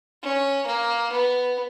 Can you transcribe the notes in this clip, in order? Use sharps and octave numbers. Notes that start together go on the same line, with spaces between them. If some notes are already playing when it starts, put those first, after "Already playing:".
C#4
A#3
B3